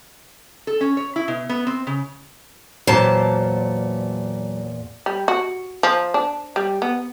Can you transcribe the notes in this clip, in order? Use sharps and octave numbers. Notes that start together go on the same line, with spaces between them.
A4
C#4
C#5
E4
B2
B3
C4
C#3
E2 A#2 F#3 C5 A5
G3
F#4
F3
D4
G3
B3